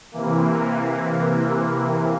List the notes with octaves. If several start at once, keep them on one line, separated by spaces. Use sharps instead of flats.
C3 E3 A#3